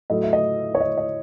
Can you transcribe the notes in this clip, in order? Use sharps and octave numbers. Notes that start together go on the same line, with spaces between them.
A2 F#3 A3 D#5
E5
D#5
C#5
D#5
D#5